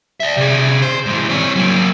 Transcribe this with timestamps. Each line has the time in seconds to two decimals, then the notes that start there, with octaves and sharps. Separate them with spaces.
0.20 D5 E5
0.37 C3 G#4
0.82 C5
1.06 G#2 E3
1.29 C4 C#5
1.56 F#3 A#3